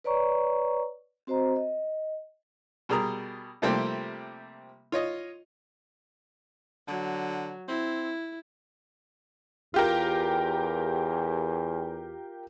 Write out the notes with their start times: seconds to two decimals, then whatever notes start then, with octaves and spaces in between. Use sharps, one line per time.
0.04 B4 C#5 D5 A#5 C#6
1.27 C4 F#4 C5 D#5 A#5
1.56 D#5
2.89 B2 G3 G#4 A#4 A#5
3.62 C3 F3 G3 A3 A#3 C4
4.92 F4 C#5 D#5
6.88 D3 F#3
7.68 C4 E4
9.74 E2 F4 G4 A#4